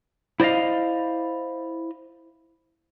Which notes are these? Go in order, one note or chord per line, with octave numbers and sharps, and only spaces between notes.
E4 C5 D5 D#5 F5